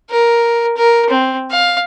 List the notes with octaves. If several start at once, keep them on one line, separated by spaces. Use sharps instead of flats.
A#4
A#4
C4
F5